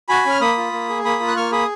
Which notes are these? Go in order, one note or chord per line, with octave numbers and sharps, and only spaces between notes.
F#4 G#5 B5
C#4 F6
A#3 B5 D#6
F4
A#3
G#4
A#3 B5 D#6
F4
F#6
A#3 C#6 F6
G#4 B5 D#6